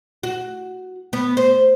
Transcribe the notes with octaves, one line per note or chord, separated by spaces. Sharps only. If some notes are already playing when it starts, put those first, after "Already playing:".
F#4
B3
C5